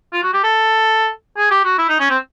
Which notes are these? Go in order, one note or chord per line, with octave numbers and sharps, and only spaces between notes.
F4
F#4
G4
A4
G#4
G4
F#4
E4
D#4
C#4
C4